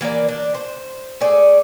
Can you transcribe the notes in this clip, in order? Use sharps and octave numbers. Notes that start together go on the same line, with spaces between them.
E3 A#3 A#4 D5
D4
C5
A3 G#4 D5